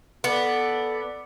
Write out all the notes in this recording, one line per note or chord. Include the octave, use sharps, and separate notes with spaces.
B3 A4 D5